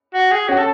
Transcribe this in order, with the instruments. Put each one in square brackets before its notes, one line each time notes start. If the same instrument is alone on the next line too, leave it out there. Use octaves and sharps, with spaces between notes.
[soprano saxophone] F#4
G#4
[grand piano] C#4 [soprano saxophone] F#4
[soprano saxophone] A4